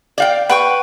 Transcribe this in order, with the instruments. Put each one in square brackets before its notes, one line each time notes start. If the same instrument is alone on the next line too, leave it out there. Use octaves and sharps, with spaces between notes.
[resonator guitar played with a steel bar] D5 F5 G5
[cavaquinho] B4 G5 C#6 [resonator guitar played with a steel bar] F#5